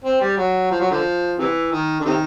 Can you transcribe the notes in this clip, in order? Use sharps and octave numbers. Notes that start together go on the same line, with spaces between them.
C4
G3
F#3
F3
F#3
D3 F3
C3 E3
D#3
D3
C3 D#3